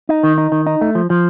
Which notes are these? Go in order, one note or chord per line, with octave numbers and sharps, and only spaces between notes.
D#4
D#3
D#4
D#3
D#4
A3
F3
F3